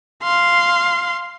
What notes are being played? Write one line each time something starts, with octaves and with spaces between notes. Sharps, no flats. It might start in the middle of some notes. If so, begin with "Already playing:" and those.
F5 C6